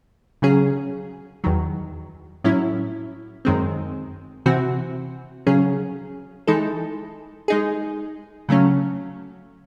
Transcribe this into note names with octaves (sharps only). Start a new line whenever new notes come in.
C#3 F#3 C#4 G#4
E2 D#3 F#3
A2 F#3 C#4 E4
F#2 D#3 G#3 C4
C3 E3 C4 F#4
C#3 F#3 C#4 G#4
E3 G#3 D#4 A4
G#3 D#4 G#4
C#3 F#3 A3 C#4